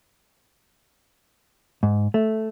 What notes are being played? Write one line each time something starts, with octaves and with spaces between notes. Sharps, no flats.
G#2
A3